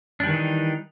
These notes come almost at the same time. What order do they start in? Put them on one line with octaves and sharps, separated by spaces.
D4 G3 D#3 E3 D#4